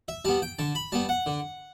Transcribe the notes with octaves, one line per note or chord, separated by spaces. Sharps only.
E5
G3 B3 A5
G5
D3 A5
B5
G3 B3 A5
F#5
D3